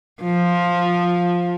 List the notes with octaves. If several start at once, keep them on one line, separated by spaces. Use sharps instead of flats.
F3